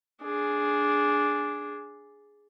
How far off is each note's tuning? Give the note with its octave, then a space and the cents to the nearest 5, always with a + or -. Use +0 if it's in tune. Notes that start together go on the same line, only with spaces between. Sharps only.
D4 -5 G#4 +5